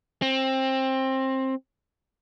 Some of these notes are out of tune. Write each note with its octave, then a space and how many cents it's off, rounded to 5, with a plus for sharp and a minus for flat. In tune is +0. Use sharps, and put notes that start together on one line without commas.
C4 +20